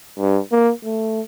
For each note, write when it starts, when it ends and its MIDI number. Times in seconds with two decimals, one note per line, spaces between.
0.19 0.39 43
0.52 0.72 58
0.84 1.21 57